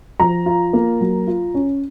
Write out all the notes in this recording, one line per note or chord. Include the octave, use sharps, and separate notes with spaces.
F3 A#5
F4
A#3
F#3
F4
C#4